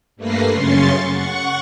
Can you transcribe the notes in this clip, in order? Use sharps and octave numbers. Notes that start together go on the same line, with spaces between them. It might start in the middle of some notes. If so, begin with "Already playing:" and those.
G2 A3 A#3 B4 A#6 C7
F#2 C#3 C#4 C6 C#6 A6
F#5 C#6